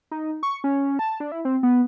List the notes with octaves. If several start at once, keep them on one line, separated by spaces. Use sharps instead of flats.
D#4
C#6
C#4
A5
D4
E4
C4
B3